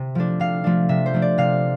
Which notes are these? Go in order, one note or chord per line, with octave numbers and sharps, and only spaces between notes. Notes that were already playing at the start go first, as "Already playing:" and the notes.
Already playing: C3 E5
F3 A3 D4
C3 F5
F3 A3 D4
C3 E5
C5
F3 A3 D4
D5
C3 F5